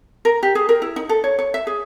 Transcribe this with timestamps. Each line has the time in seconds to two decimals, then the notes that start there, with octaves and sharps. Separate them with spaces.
0.25 A#4
0.43 G4
0.55 G#4
0.69 A#4
0.82 E4
0.96 D#4
1.09 A4
1.24 C#5
1.39 C#5
1.54 E5
1.67 G#4